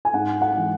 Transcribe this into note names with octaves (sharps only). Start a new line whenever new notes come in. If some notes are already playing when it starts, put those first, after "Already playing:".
G#5
G#2 F#5
F#5
E3 G#3